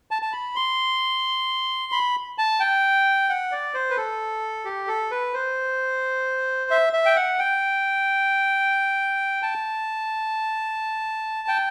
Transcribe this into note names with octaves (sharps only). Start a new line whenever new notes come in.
A5
A5
B5
C6
B5
A5
G5
F#5
D5
C5
B4
A4
G4
A4
B4
C5
E5
E5
G5
F#5
G5
A5
G5